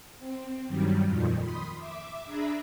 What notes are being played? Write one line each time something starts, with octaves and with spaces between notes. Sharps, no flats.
C4
G2 D#3 F#3 G3
F2 A#2 D#3 F3
B5 C6 D#6
E5 D6
D4 G#4 E5 A#5 B5